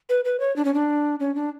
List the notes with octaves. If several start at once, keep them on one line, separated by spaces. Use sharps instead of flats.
B4
B4
C#5
D4
C#4
D4
C#4
D4